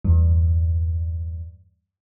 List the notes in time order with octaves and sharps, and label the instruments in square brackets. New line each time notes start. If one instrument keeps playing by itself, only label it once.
[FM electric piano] E2 G2